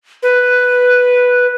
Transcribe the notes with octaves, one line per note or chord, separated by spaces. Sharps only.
B4